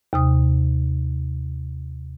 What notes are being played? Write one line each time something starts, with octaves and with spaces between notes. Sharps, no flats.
D#2 C3 D#6